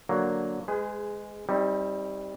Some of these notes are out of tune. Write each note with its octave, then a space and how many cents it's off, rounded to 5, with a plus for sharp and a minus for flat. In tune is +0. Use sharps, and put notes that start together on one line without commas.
D3 +0 F#3 +0 A#3 +0
G#3 +0 G#4 -10 B4 +40
G3 +0 C4 +35 D#4 +35